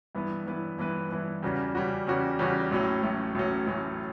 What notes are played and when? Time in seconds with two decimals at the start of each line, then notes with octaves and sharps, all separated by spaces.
0.15 G2 E3 B3 E4 B4
0.47 G2 E3 B3 E4 B4
0.78 G2 E3 B3 E4 B4
1.11 G2 E3 B3 E4 B4
1.43 E2 C#3 G3 C#4 F#4
1.75 E2 C#3 G3 C#4 F#4
2.07 E2 C#3 G3 C#4 F#4
2.39 E2 C#3 G3 C#4 F#4
2.71 A1 A2 F#3 C#4
3.03 A1 A2 F#3 C#4
3.35 A1 A2 F#3 C#4
3.67 A1 A2 F#3 C#4